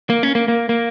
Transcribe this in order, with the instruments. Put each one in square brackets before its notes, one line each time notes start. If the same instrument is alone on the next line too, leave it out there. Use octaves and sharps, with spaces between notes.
[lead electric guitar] A#3
C#4
A#3
A#3
A#3